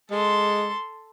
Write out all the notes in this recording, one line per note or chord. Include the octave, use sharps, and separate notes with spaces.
G#3 A4 C6